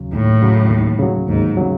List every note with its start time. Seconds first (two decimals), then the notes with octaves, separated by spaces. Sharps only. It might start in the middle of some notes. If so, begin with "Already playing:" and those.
Already playing: D#2 C#3 F#3
0.12 D#2 A2
0.42 C#3 F#3
0.70 D#2
0.99 C#3 F#3
1.28 D#2 G#2
1.57 C#3 F#3